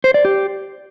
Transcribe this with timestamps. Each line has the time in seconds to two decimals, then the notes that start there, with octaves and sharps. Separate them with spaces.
0.04 C5
0.14 D5
0.25 G4